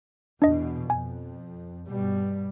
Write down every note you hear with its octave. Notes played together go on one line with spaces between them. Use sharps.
E2 B2 D4 D#5
F2 G#5
G2 B2 G3